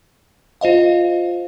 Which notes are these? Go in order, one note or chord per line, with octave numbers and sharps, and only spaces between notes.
F4 C5 D#5 F5